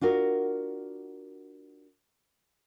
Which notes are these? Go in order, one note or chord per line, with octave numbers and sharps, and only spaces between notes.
D4 F4 F#4 A#4